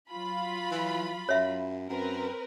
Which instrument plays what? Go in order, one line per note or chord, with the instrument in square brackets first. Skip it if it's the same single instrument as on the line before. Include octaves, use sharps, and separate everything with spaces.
[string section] F#3 F4 B5
[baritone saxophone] E3
[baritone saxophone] F#2 [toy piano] C#5 E5
[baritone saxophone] F#2 [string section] C4 A#4 B4